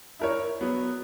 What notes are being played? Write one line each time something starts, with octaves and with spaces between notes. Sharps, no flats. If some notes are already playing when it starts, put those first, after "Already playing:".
E4 A#4 C#5
F#3 B3